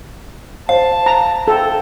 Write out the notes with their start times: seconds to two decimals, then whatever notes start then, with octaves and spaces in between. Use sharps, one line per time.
0.69 C5 F5 A5
1.06 A#5
1.48 A4 G5